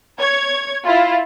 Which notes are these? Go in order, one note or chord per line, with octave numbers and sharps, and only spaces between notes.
C#5 G#6
E4 F4